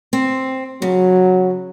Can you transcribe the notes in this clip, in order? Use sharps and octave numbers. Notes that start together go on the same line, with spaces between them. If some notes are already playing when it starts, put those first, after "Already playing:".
C4
C#3 F#3